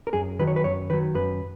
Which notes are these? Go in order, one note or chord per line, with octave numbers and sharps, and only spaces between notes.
A#4
F#2 G#4
D#3 F#3 B4
C#5
B4
F#2 C#5
D#3 F#3 B4
F#2 B4